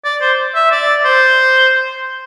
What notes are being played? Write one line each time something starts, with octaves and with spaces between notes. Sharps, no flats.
D5
C5
E5
D5
C5